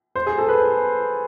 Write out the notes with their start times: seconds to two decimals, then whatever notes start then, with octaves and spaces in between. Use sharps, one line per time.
0.15 C5
0.27 G#4
0.38 A4
0.49 B4